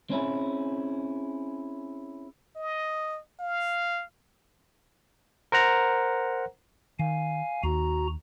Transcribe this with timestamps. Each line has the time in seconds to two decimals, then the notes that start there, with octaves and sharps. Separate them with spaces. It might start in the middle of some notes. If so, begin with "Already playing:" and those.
0.10 C4 C#4 E4 G#4
2.56 D#5
3.39 F5
5.52 A#4 C5 F#5 A#5
6.99 D#3 F5 G#5
7.63 D#2 F#4 A#5